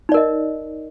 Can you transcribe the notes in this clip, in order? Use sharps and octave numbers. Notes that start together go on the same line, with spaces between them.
D#4 A#4 D5 D#5